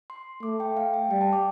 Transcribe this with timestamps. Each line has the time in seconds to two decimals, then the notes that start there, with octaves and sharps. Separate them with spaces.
0.10 C6
0.43 A3 D6
0.60 G5
0.77 F5
0.94 G5
1.10 G3 G5
1.21 A5
1.33 D6